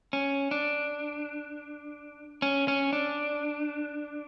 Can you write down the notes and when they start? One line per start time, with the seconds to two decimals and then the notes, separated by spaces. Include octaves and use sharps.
0.13 C#4
0.51 D4
2.42 C#4
2.68 C#4
2.93 D4